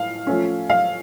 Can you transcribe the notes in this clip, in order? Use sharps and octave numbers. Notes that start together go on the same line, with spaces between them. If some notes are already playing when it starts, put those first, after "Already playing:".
Already playing: A2 F5
F3 A3 C#4
F5